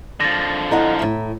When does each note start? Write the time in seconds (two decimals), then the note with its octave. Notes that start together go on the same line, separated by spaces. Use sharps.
0.21 D3 F3 A6 A#6
0.71 E4 A4 D#5 F#5 A#5
0.99 A2 E5